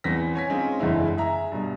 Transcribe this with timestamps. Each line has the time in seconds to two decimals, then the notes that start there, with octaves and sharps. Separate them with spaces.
0.04 E2 B3 C4 C5 A#6 B6
0.35 C#5 G#5 B6
0.50 G#3 C4 C#4 D#4 F4
0.79 F#1 E2 D3 G#3 E4
1.17 G#4 E5 A#5
1.52 G2 B2